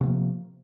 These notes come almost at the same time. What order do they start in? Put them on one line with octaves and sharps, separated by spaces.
C3 B3 F3 A#3